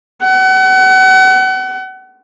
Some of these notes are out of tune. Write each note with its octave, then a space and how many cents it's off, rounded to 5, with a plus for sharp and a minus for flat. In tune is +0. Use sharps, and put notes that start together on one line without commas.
F#5 +35